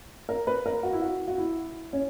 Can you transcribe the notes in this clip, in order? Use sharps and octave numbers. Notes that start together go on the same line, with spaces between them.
A#4
B4
A#4
F#4
E4
F#4
F#4
E4
C#4